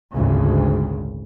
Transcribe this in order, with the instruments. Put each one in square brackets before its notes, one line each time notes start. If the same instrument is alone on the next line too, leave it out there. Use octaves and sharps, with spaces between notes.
[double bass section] G#1 D2 A#2 C#3